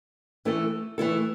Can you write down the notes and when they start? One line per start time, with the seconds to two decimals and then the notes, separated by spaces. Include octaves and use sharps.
0.45 E3 A3 E4 A4
0.98 E3 A3 E4 A4